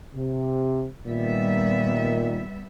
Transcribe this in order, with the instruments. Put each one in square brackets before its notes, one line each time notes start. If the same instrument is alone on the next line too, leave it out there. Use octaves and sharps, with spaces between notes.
[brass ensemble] C3
[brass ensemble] A#2 D#3 [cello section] G3 B3 E5